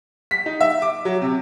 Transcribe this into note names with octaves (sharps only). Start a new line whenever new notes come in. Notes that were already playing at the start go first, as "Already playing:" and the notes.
B6
D#4
E5
D6
F#3
C3